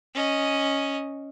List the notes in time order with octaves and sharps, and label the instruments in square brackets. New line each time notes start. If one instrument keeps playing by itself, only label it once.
[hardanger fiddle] C#4 D#5